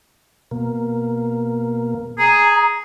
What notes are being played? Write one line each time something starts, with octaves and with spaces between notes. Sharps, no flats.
B2 A#3
G#4 A#5